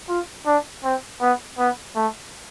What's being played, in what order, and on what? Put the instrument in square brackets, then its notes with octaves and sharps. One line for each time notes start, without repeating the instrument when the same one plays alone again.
[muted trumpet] F4
D4
C4
B3
B3
A3